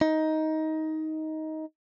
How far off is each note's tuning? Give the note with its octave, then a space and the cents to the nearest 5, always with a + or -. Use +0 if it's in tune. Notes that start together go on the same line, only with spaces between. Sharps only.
D#4 +15